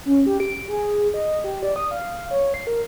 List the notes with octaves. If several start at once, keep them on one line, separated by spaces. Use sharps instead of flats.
C#4
G4
D7
G#4
D#5
G4
D5
D#6
F5
C#5
C7
A#4